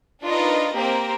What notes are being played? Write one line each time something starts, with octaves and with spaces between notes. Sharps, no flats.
D4 D#4 F4 A#4 B4 D#5
A#3 C4 G4 A#4 C5